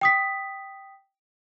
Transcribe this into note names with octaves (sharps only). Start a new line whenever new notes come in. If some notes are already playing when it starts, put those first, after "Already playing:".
G5 D#6 B6